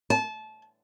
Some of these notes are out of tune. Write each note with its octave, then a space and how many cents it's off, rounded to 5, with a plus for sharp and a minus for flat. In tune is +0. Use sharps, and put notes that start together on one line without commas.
A5 -25